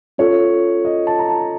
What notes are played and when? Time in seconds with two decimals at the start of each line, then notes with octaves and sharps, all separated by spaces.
0.18 C#4 F4 A4 C#5
0.85 D#5
1.07 A5
1.19 A#5
1.29 A5